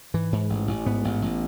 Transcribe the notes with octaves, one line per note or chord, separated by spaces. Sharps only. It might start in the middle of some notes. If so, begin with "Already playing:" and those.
G#2 E3
G#2
A1
A1
G#2 B3
A1
A1